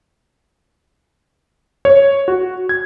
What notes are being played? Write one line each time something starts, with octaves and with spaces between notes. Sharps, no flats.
C#5
F#4
G#6